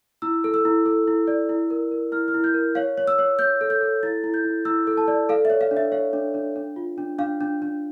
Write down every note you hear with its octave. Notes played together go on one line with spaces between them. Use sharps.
E4 E6
A4
E6
E4
A4
E4
D5
E4
A#4
A#4
E4 F6
F6
E4
G6
A#4
C#5 F5
C#5
E6
C#5
C#5 G6
A4
G6
A4
E4 A6
E4
G6
E4
E4 E6
A4
A5
D5
A4 F5
C#5 E5
F5
D4
E5
C#5 F5
D4
D4
D4
F4
D4
D4 F5
D4
D4